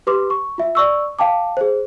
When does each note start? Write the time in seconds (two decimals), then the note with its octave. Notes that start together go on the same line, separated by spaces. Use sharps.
0.07 G4 B4 C6 D6
0.30 C#6
0.58 F4 E5
0.75 D5 C#6 E6
1.19 F5 G5 A5 D6
1.57 G#4 C5